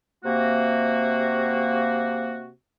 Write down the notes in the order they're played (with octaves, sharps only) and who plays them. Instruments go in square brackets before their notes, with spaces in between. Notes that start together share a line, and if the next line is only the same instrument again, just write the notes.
[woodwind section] C3 A#3 F#4